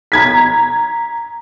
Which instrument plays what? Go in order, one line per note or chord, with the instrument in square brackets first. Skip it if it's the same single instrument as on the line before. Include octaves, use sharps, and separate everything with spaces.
[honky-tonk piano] A#5 G#6 B6